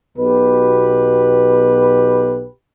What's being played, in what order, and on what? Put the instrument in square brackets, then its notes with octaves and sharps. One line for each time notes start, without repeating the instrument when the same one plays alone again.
[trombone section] B1 B2 G4 B4